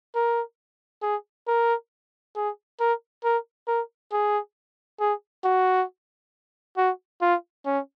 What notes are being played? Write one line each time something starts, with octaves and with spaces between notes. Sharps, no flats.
A#4
G#4
A#4
G#4
A#4
A#4
A#4
G#4
G#4
F#4
F#4
F4
C#4